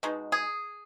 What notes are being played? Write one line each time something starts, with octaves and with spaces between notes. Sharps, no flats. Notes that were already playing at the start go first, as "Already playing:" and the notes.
B2 G#3 D#4 F#4
G#4